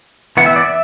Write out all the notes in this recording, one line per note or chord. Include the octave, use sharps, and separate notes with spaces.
E3 B3 F#5
E5
D5
E5